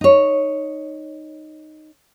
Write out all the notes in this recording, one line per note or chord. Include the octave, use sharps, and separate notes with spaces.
D#4 C#5